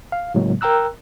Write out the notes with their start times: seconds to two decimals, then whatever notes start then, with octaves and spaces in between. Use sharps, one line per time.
0.12 F5
0.34 A2 C#3 F#3 G#3 A#3
0.61 A#4 G5 A#5 E6 F#6